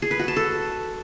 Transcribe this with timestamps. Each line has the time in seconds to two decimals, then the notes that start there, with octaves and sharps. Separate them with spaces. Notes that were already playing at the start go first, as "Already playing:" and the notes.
0.02 G#4
0.11 B4
0.19 F#4
0.28 A5
0.37 A4